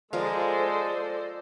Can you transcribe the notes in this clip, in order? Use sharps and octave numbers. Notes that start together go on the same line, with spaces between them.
F3 G#3 A4 A#4 C5 D5 F5